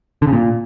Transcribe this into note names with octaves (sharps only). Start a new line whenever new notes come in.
D3
C#3
A#2